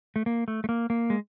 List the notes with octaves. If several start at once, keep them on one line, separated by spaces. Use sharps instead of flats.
A3
A#3
A3
A3
A#3
A#3
G#3